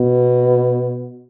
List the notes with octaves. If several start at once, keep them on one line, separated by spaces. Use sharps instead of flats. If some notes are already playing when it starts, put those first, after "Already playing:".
Already playing: B2